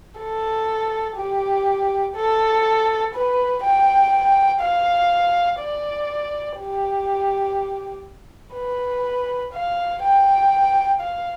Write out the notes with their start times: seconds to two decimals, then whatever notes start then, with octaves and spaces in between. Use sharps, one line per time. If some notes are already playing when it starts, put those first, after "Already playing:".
0.19 A4
1.17 G4
2.16 A4
3.14 B4
3.63 G5
4.61 F5
5.60 D5
6.59 G4
8.54 B4
9.53 F5
10.03 G5
11.01 F5